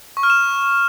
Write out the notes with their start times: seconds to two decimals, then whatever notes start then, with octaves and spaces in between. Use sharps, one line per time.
0.17 C#6
0.23 F6
0.30 E7